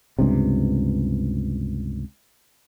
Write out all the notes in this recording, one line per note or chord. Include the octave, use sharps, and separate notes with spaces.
C#2 G2 C3